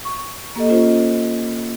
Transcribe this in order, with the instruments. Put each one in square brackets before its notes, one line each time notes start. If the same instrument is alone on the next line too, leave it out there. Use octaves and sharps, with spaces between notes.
[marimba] C#6
A#3 G4 A4 D#5
C#4 F4 C5